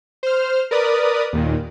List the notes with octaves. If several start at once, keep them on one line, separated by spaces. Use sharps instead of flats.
C5 F6
A#4 B4 D5 D#6
D#2 A#2 D#3